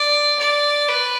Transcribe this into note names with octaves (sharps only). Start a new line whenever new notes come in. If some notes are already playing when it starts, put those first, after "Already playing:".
Already playing: D5
D5
B4